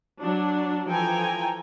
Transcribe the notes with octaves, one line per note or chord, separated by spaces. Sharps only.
F#3 D4
E3 F3 A4 G5 G#5 A#5